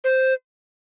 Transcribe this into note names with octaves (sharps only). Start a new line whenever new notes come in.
C5